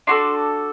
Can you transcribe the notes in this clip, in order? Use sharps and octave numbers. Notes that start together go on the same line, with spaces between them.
D4 F#4 A4 C6